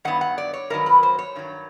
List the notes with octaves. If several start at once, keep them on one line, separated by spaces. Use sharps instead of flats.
G2 D#3 F#3 B3 F#5
F#5
D5
C#5
G2 D#3 F#3 B3 A#4
B4
C5
C#5
G2 D#3 F#3